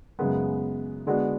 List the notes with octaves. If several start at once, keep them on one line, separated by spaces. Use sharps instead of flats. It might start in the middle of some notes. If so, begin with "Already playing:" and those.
F#2 C#3 G#3 B3
D3 G#3 B3 D4 F#4